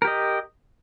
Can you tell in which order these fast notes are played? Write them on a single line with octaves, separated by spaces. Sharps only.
A#4 G4 D#5